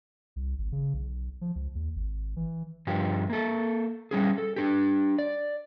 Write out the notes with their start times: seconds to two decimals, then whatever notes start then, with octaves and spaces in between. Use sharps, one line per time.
0.36 C2
0.58 G#1
0.72 C#3
0.94 B1
1.41 F3
1.55 C#2
1.75 D#2
1.96 G#1
2.36 E3
2.87 G2 F3 G4
3.30 A#3 A4
4.11 G3 C#4 G#4
4.38 A4
4.56 D4 G4
5.18 D5